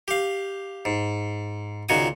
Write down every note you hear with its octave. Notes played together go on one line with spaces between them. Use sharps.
G4 F5
G#2
C#2 A#2 D#3 F#4 G#5 D#6